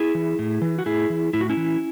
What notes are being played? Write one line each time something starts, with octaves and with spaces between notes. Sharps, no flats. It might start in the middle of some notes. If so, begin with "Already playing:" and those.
Already playing: E4 G#4
E3
A2
E3
F#4
A2 E4 G#4
E3
A2 E4
F#4
C#4 E4
E3